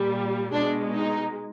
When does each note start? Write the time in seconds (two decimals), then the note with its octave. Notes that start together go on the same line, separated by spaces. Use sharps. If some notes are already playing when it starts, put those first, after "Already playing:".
Already playing: A#2 G3
0.52 B2 G#3 D4
0.93 D#4